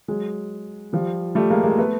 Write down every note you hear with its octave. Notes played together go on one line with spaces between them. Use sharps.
F#3 G#3
F3 G3
G3 A3
G#3 A#3
G#3 A#3
A3 B3